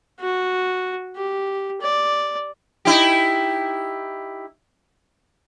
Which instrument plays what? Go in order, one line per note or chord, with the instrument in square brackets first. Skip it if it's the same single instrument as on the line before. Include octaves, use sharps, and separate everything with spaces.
[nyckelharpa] F#4
G4
D5
[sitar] D#4 E4 G4